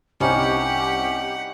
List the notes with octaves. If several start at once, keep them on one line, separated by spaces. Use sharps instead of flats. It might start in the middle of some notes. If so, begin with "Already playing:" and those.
C2 G3 C#4 D#4 G4 C5 F#5